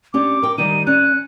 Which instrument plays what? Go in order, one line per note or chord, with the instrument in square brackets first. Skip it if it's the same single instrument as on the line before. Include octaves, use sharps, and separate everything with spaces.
[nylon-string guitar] C#4 D4 G4 [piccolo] D6
[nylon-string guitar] A#4 G5
[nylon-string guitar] D#3 G3 D#4 [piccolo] D#7
[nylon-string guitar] C#4 D5 [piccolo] F#6